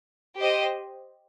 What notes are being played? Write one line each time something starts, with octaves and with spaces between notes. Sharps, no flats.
G4 C5 D#5